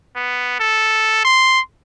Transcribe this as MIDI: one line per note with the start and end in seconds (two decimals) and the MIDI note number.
0.16 0.55 59
0.60 1.22 69
1.24 1.60 84